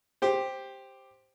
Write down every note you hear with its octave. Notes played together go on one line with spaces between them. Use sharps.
G4 C5